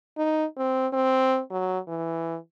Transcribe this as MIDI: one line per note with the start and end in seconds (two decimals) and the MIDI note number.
0.18 0.45 63
0.58 0.87 60
0.93 1.41 60
1.51 1.79 54
1.88 2.37 52